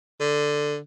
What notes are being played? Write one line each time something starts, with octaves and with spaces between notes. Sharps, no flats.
D3